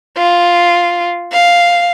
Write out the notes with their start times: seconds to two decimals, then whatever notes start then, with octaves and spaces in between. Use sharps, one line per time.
0.17 F4
1.33 F5